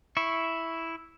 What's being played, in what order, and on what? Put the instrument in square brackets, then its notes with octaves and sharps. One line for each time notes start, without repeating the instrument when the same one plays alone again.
[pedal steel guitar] E4 C#6